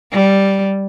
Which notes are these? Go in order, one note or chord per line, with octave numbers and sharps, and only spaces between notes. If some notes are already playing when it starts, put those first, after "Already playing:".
G3